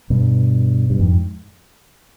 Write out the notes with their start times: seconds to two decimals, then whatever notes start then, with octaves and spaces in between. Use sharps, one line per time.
0.10 G2 B2
0.90 G2
1.00 F2 G#2